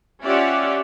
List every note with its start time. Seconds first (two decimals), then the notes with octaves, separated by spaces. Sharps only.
0.23 C#4 F4 G4 D5 E5 F#5